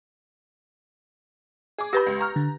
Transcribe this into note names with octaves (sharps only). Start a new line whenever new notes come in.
G#4 D6
G4 B4 B5 G6 A#6
C#2
A#5 C#6 F6
D3